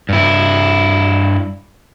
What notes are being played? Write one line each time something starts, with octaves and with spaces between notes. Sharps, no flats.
G2 E4